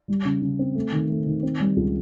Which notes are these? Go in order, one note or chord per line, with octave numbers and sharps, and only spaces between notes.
G3
C#3
C#3
C4
A3
D#3
A3
D#3
C4
G3
C#2